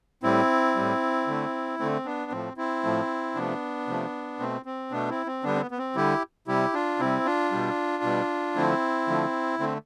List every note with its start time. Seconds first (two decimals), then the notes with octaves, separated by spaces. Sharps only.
0.23 A2 G3 C4 E4
0.75 A2 G3
1.27 D3 A3
1.79 D3 A3 C4
2.05 B3 D4
2.31 A2 F3 A3 C4
2.57 C4 E4
2.83 A2 F3 A3
3.35 C3 F3 A3 B3 D4
3.87 C3 F3 A3
4.40 B2 A3 C4
4.66 C4
4.91 B2 A3 B3 D4
5.09 C4 E4
5.26 C4
5.43 D3 G3 B3 D4
5.56 C4
5.61 B3
5.71 B3
5.78 C4
5.95 D3 G3 E4 G4
6.47 C3 G3 E4 G4
6.74 D4 F4
7.00 C3 G3 C4 E4
7.25 D4 F4
7.52 B2 G3
8.03 B2 G3
8.56 D3 F3 A3 C4 E4
9.08 D3 F3 A3
9.60 D3 A3 C4